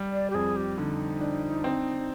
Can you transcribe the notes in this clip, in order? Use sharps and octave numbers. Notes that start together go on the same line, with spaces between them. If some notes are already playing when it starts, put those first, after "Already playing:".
Already playing: G3
D5
G4
F2 G#4
G4
D3 D#4
D4
C4